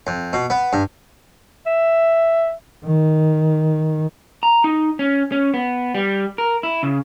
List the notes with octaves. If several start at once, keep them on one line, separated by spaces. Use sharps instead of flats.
F2
B2
B3
G2
E5
D#3
A#5
D#4
C#4
C#4
B3
G3
A#4
E4
C#3